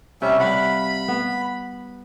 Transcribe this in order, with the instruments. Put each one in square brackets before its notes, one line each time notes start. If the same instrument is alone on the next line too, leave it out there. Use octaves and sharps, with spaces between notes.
[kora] C3 [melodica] G3 C#4 E5
[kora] G3 F5 F#5 [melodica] B5
[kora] B3